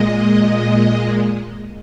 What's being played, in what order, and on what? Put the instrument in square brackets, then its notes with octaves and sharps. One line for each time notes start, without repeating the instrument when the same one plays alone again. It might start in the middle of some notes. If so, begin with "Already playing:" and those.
Already playing: [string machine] A#2 G#3 D#5